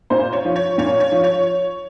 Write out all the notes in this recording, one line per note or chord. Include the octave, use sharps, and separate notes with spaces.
A#2 C5
C#5
F3
C#5
A#2 C#5
C#5
F3
C#5